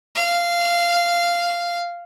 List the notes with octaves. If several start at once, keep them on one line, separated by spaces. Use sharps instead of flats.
F5